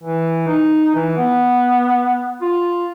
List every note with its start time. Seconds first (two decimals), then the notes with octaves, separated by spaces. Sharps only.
0.04 E3
0.47 D#4
0.95 E3
1.17 B3
2.41 F4